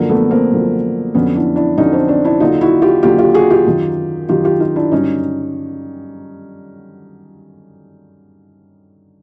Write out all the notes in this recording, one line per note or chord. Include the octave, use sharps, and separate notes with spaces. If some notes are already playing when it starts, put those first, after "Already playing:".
Already playing: F#2 D3 F3 A#3
A3 B3
A#3 C4
F#2 D3 F3
F2 D3 F#3 B3 C#4
D4 E4
D4 E4
F2 D3 F#3 C#4 D#4
C4 D4
C4 D4
D4 E4
D#2 D3 F#3 D#4 F4
E4 F#4
F4 G4
D#2 D3 F#3 F4 G4
F4 G4
F#4 G#4
F4 G4
F#2 D#3 F#3
F#2 D#3 F#3 F4 G4
F4 G4
D#4 F4
D4 E4
G2 D3 F#3 C#4 D#4